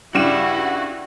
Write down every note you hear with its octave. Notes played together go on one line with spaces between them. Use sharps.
G2 C#3 G3 E4 F#4 E7